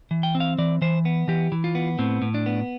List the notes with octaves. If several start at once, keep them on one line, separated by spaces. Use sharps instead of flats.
E3
G5
C4
F5
E3 D5
E3 C5
B3
E3 G4
E3
F4
B3
A2 C4
A2
D4
B3